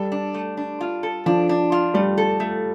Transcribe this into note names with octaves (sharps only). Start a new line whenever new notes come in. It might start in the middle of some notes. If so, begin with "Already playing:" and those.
Already playing: G3 A4
D4
A3
D4
F4
A4
F3 D4
D4
F4
G3 A3
A4
A3